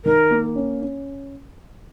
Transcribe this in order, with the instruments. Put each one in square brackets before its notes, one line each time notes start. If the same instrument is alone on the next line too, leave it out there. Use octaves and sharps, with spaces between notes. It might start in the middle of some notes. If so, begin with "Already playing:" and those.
[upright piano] D#3 [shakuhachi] A#4
[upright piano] A#3
C#4
C#4